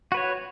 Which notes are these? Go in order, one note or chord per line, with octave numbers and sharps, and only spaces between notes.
F#4 B4 C#5